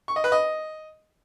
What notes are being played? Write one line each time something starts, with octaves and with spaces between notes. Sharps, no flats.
C#6
D#5
B4
D#5